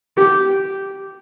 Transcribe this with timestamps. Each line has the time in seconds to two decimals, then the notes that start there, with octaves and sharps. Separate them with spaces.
0.17 G4